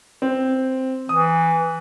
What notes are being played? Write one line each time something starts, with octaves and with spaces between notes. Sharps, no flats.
C4
E3 D#6